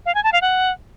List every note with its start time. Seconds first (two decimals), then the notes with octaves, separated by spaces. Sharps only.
0.06 F5
0.15 G#5
0.24 A5
0.33 F5
0.42 F#5